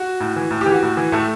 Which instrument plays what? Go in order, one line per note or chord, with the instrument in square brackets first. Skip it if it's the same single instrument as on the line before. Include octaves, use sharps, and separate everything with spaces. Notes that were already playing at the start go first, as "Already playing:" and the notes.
Already playing: [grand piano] F#4
A2
E3
A2
G4
E3
F#4
A2
E3
A2 A3